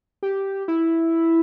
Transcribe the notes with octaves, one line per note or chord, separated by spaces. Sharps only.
G4
E4